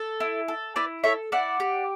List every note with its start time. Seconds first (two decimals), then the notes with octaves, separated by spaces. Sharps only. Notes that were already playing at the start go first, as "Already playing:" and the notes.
Already playing: A4
0.20 E4
0.48 A4
0.76 E4 B4 D5
1.04 A4 C#5 E5
1.32 E4 D5 F#5
1.60 G4